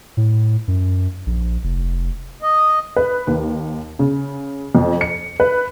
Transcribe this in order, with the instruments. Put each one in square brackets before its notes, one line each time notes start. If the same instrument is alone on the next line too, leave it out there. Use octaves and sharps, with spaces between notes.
[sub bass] A2
F#2
A#1
F1
[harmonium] D#5
[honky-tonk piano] B4
D#2
C#3
F2
C#7
B4